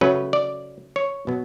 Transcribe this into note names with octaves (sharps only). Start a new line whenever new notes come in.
C#3 F#3 A3 C#4 B4
D5
C#5
B2 F#3 B3